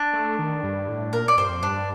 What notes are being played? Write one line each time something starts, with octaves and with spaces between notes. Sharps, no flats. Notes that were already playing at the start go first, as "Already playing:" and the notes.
Already playing: D4
A3
D#3
G2
A2
A#2 A#4
D5
G2 C5
F2
G2 D4